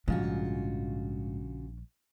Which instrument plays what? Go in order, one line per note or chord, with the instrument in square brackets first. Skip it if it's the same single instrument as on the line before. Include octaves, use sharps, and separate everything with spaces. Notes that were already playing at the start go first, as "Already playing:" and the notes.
[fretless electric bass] A#1 F3 G3 [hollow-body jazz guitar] G#2 [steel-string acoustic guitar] C#3 F4 F#4 [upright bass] D4